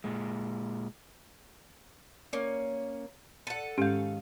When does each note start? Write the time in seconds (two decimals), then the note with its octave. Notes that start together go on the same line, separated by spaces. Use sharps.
0.04 A#2 G#3
2.33 A#3 C#4
3.47 A4 F#5 D#7
3.78 G#2 D#3 C#4 G4 F5 G6